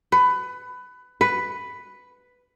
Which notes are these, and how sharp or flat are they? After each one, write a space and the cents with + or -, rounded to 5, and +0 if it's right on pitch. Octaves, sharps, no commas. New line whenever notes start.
B4 +20
B4 +5